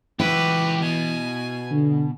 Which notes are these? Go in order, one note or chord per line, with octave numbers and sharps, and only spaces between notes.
C#2 E3 E4 F#4 G4 B4
B2 G#5
D3